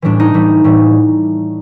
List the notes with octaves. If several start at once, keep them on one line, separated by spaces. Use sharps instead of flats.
A2 E3 G3 D4
D#4
A2 E3 G3
A2 E3 G3